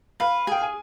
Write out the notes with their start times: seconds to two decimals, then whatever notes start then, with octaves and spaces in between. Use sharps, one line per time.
0.20 B4 F5
0.47 G#4 G5
0.62 G#5